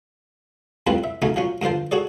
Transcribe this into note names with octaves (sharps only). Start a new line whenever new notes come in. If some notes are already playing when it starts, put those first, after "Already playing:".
F2 A2 G3 C4 F4 B4
E5
B1 C#3 F#3 A3 D#4 G#5
F3 F#3 C#4
G2 D3 F3 C5 A5
F#4 G#4 A4 C#5 D5